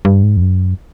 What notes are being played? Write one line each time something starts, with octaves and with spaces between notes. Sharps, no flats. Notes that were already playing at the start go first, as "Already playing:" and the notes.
G2
G#2
F2
F#2